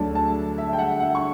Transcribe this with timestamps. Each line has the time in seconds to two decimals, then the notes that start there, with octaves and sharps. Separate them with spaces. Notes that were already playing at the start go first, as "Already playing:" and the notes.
Already playing: D2 D3 F#3 A3 D4 A5
0.15 A5
0.58 E5
0.73 G5
0.78 F#5
1.00 F#5
1.15 C#6